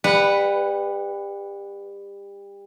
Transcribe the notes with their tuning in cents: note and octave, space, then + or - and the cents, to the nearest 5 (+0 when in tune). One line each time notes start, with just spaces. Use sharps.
G3 +30 B4 +0 F#5 +0